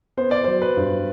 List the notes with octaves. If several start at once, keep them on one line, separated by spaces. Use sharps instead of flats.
B3 C5
D5
F#3 C5
B4
G2